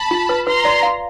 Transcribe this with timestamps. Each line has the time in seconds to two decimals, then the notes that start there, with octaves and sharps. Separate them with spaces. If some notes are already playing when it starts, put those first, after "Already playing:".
Already playing: A5 B5
0.11 F4
0.29 B4
0.46 B4 A#5 C6
0.65 D5
0.83 F5